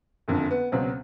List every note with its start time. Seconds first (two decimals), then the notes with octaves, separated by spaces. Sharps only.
0.28 F#1 F2 D3
0.51 B3
0.72 C#2 B2 F#3 C4